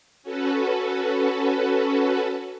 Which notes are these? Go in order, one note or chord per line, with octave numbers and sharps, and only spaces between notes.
C#4 F#4 A4 B4